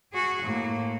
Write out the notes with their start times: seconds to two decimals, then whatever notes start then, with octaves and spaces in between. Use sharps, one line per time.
0.13 F#4 G#4
0.42 A2 A#3